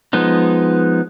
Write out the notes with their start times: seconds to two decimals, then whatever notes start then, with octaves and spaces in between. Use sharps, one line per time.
0.13 F3 G#3 B3 D#4